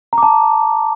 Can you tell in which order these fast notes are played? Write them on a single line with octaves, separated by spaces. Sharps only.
A#5 D6 A5